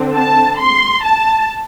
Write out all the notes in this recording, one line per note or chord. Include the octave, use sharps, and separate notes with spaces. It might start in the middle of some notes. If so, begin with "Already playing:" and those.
Already playing: D3 C4
A5
C6
A5